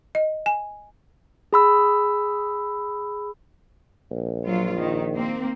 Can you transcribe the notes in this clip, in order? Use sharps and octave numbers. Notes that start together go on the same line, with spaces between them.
D#5
G#5
G#4 B5 E6
A#1
F#3 F4
D#3
A#3 C4